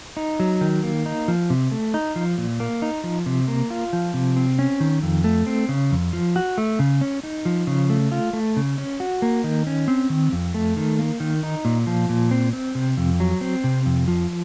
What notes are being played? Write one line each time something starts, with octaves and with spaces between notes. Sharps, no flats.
D#4
F#3
D#3
A#3
D#4
F3
C3
A3
D#4
F3
A#2
A#3
D#4
F3
C3
A#3
F4
F3
C3
C4
C#4
D#3
F2
A3
C4
C#3
F2
F3
F#4
A3
C#3
C#4
D#4
F3
C#3
A3
F4
A3
C#3
C#4
F#4
A#3
D#3
C#4
C4
D#3
F2
A3
D#3
A#3
D#3
D#4
A#2
F3
A#2
C4
C4
C3
F2
F#3
C4
C3
F2
F3